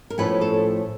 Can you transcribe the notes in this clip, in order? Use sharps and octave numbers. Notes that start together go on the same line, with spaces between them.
A#4
A2 F3 A3 C#4 B4
A4